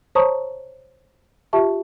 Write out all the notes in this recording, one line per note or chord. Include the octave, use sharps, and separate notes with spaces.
C5 C#5 A5 A#5 C#6 D#6
F4 G4 E5 A5 C#6